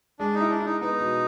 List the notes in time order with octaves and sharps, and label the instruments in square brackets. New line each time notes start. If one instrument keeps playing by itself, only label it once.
[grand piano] G#3 [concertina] D4
[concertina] D#4
[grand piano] E4
[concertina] D4
[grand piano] E4
[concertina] D#4
[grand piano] B3 [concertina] D#4
[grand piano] B2